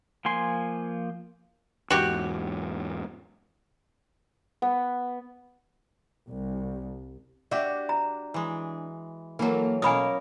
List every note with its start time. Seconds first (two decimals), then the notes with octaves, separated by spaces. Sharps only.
0.25 F3 A#3 G#5 C6
1.90 E2 G#2 F#4 G4
4.62 B3
6.28 C2
7.51 D4 F#4 G4 E5
7.89 A#5
8.34 E3 G#3
9.39 E3 F#3 A#3 A4
9.82 B2 A#3 C#4 F4 A#4 G#5 B5 D#6